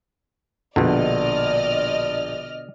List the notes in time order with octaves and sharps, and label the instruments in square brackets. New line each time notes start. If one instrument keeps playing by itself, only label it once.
[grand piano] A#1 [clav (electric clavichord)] B2 D3 [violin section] D5 D#5 F6